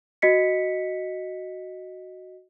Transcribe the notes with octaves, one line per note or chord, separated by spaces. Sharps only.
F#4 D#5 B6 C#7